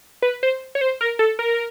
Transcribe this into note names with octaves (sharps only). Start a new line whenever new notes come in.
B4
C5
C#5
C5
A#4
A4
A#4